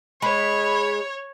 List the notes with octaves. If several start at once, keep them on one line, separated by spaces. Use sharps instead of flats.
G#3 C#5 B5